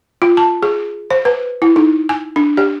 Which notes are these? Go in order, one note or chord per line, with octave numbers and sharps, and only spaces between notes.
F4
A5
G#4
C5
B4
E4
D#4
G#5
D4
G4